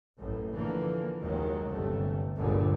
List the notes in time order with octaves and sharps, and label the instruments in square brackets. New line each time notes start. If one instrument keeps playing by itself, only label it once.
[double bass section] A1 F#2 A2
D3 E3 F3 A#3
F#1 D#2 D#3 F#3 G#3
G1 C3 A3
G1 C#2 F#2 A#2 D3 B3